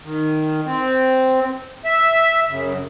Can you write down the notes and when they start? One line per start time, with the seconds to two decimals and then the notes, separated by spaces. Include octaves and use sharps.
0.04 D#3
0.66 C4
1.85 E5
2.49 F#2 C#3